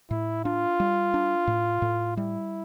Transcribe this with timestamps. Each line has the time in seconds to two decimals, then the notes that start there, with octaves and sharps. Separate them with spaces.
0.10 A2 E4
0.45 D4 F4
0.80 G3
1.14 D4
1.47 A2
1.82 A2
2.17 G3 E4